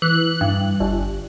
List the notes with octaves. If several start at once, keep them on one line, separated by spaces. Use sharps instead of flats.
E3 F#6
G2
G1